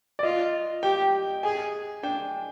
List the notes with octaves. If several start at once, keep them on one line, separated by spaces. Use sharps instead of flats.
D5
F4 D#5
G4 G5
G#4 G#5
D4 G5